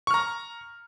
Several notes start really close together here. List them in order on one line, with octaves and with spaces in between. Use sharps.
C#6 F6 A#5